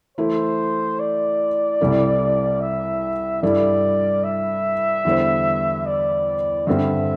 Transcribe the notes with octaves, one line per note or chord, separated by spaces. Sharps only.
E3 A3 E4 C5
D5
C2 C3 G3 E4 A4
E5
G2 G3 E4 A4 D5
E5
E2 D3 G3 E4 C5
D5
G2 D3 G3 C4 E5